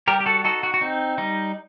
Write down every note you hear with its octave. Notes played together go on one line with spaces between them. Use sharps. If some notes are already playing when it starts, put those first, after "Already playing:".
G3 G4 A#4
G4
F#4 A4
D#4 F#4 A4
F#4
F#4
C4 D#4
G3 D#4